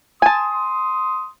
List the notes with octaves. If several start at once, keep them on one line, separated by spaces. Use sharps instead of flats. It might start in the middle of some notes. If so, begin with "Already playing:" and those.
G#5 A5 C6 D#6